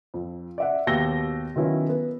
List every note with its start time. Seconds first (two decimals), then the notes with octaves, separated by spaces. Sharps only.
0.14 F2
0.58 D5 E5 F#5
0.87 D#2 B2 G4 E6 A#6 G7
1.56 D#3 F#3 B3 C#4 E4 F4
1.89 B3